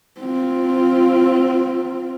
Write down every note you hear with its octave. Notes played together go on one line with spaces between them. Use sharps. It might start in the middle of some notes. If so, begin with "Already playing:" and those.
C4 F4